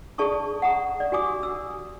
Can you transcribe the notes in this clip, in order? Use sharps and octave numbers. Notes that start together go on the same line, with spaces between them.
G#4 D5 A5 C#6 D#6
F#5 A#5 D#6
D5
F#4 G4 G#5 D6 D#6
E6